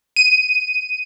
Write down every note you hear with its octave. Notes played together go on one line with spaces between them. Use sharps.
D#7